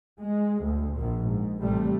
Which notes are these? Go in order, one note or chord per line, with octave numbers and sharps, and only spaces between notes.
G#3
D2
A#1 A#2
G#2
A1 C3 G3 A3